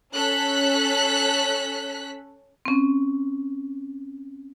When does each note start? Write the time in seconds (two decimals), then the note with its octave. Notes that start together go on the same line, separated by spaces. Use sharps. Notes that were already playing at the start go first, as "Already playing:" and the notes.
0.13 C#4 A4 F#6 B6
2.65 C4 C#4